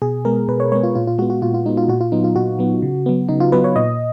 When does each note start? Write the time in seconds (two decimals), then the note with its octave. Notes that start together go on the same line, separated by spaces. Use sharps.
0.02 B2 G#4
0.25 G#3 B3 A#4
0.48 B2 B4
0.60 C#5
0.72 G#3 B3 C#5
0.83 F4
0.95 A#2 F4
1.07 F4
1.18 G#3 F#4
1.22 B3
1.30 F#4
1.42 A#2 F4
1.54 F4
1.66 G#3 B3 D#4
1.77 F4
1.88 A#2 F#4
2.01 F4
2.12 F#3 B3 D#4
2.24 F4
2.35 A#2 F#4
2.59 F#3 B3
2.82 C#3
3.06 F#3 B3
3.29 C#3 D#4
3.40 F4
3.52 F#3 B3 B4
3.64 C#5
3.76 A#2 D#5